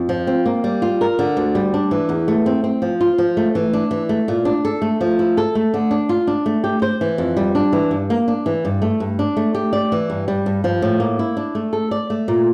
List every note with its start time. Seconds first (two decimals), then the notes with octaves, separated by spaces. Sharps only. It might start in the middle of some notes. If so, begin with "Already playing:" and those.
Already playing: F2
0.09 F3
0.27 C4
0.46 A#3
0.64 G3
0.82 F4
1.01 A#4
1.19 D3
1.37 D2
1.55 G3
1.74 D4
1.91 E3
2.09 E2
2.28 A3
2.46 C4
2.64 C4
2.82 F3
3.01 F4
3.18 F3
3.37 A3
3.55 E3
3.73 D4
3.91 E3
4.09 A3
4.28 A#2
4.45 D4
4.65 A4
4.82 A3
5.01 F3
5.19 E4
5.37 A4
5.55 A3
5.74 D3
5.91 D4
6.09 F4
6.27 D4
6.46 A3
6.64 G4
6.82 C5
7.01 E3
7.18 F2
7.37 G3
7.55 D4
7.73 E3
7.91 G2
8.10 A#3
8.28 D4
8.46 E3
8.65 G2
8.82 A3
9.00 G2
9.19 D4
9.37 A3
9.55 G4
9.73 D5
9.92 E3
10.10 G2
10.28 G3
10.46 G2
10.64 F3
10.82 A2
11.00 A#3
11.19 E4
11.37 D4
11.55 A3
11.73 A4
11.91 D5
12.10 A3
12.28 A#2